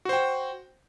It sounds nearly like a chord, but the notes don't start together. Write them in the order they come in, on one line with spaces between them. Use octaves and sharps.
F#4 C5 G5